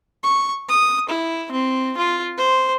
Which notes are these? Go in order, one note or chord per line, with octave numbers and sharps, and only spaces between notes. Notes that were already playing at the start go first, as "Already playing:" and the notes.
C#6
D#6
E4
C4
F4
C5